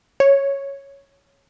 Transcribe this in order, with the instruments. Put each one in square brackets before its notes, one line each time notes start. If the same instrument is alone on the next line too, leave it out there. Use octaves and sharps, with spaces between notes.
[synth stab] C#5